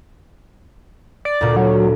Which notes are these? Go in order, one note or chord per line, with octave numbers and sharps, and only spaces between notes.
D5
D2 A#2
F#3